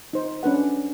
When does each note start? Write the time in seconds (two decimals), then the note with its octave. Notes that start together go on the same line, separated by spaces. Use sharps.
0.13 D#4 C5
0.43 C#4 D4 B4 F#5